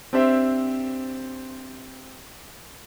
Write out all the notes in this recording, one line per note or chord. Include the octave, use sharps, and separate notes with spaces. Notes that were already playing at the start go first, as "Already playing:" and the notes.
C4 D4 G4 C5 E5